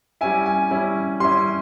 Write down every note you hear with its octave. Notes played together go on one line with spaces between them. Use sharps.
G3 C#4 E4 G#5
G#5
G3 C#4 E4
G3 C#4 E4 C6